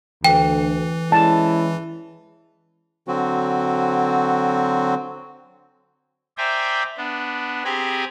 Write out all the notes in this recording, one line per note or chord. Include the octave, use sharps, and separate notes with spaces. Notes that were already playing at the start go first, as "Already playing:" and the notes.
D2 E3 G5
G#3 C#4 E4 A5
D3 F#3 C4 F#4
C5 D5 E5 G5 G#5 A#5
B3 D4
C4 G4 G#4 G#5 A#5 B5